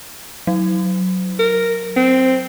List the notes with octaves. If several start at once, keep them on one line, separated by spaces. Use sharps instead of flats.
F#3
A#4
C4